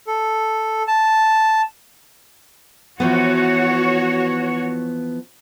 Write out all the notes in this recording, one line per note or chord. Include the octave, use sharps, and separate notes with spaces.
A4
A5
E3 F3 B3 F#4 C#5